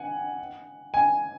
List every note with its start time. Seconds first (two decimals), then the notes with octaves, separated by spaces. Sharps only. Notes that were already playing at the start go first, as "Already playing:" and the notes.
Already playing: F#5 G#5
0.94 G#5